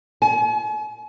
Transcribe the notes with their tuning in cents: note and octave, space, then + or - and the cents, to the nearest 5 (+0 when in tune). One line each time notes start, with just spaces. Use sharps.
G#5 +40